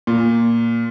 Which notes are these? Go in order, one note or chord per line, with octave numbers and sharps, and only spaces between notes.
A#2